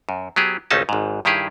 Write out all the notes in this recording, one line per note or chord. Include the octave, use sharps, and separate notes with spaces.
F#2
F#3 B3 G4 G#4
G#1 C#2 A3 C#4 D#4 A5
G#1 G#2
G2 D#3 E4 G4 G#4